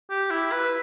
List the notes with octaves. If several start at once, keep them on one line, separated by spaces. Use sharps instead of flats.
G4
E4
B4